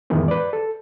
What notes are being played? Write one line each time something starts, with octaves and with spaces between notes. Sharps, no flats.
F2 A2 D#3 E3 G#3 B3
B4 D5
A4